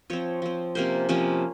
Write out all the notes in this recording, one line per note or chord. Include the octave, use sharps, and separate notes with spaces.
F3 C4 C#5
F3 C4
C3 F3 A#3 C#4 C5
C3 F3 A#3 C#4